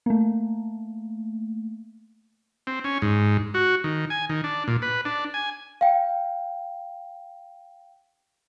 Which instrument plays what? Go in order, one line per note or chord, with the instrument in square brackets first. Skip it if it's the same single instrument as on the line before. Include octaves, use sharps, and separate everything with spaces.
[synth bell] A3 A#3
[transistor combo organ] C4
C#4
G#2
F#4
D#3
G#5
D#3
D4
A#2
B4
D4
G#5
[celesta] F5 G5